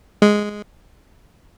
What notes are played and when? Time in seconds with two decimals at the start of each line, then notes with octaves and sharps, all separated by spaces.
0.22 G#3